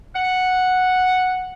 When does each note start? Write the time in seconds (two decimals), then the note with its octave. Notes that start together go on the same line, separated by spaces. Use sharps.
0.15 F#5